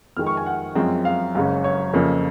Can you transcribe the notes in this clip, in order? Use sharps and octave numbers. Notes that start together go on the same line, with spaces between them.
F2 D#3 G#3 F6
C#6
G#5
F#5
F#2 F3 G#3 C4
F5
F#1 F#2 C#3 G#3 C#4
C#5
F2 C#3 F3 A#3 C#4